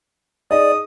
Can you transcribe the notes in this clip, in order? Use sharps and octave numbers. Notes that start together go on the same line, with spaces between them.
D#4 G#4 D5 D#5 D#6